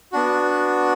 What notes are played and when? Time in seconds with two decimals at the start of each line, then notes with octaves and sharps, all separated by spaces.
0.12 B3 D4 F#4